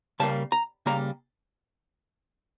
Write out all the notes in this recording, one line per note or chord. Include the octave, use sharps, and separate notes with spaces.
C#3 G3 A#3 A5
A#5
C#3 G3 A#3 A#5